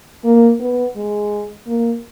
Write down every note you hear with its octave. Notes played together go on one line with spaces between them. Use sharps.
A#3
B3
G#3
A#3